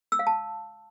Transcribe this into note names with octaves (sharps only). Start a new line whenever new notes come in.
E6
F5
A5